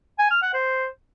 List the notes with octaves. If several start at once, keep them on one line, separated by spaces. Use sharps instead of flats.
G#5
F6
F#5
C5